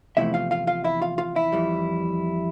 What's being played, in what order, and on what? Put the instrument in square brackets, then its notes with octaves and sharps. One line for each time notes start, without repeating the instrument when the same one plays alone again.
[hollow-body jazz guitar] E2 C3 F3 A3 E4 E5
F4 F5
F4 F5
F4 F5
E4 E5
F4 F5
F4 F5
E4 E5
F2 E3 G3